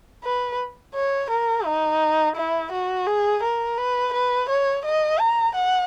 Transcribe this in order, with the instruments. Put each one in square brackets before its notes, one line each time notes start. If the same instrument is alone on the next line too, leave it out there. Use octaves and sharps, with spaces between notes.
[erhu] B4
C#5
A#4
D#4
E4
F#4
G#4
A#4
B4
B4
C#5
D#5
A#5
F#5